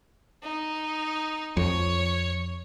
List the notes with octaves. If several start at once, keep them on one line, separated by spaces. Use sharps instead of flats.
D#4
F2 C#5